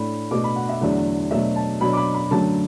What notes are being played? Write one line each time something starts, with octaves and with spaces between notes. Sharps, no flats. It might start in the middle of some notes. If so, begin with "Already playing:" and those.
Already playing: A2 A3 D4 B5
B2 A3 D4 D6
B5
F#5
E5
E2 D3 F#3 A3 D4
B2 F#3 A3 D4 E5
A5
B2 F#3 D4 B5
D6
B5
B5
F#2 D3 F#3 A3 A5